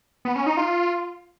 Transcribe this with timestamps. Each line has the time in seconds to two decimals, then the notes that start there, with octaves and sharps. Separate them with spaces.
0.25 B3
0.36 C#4
0.46 D#4
0.57 F4